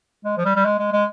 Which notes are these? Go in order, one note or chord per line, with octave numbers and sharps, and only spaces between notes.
G#3
F3
G3
G3
G#3
G#3
G#3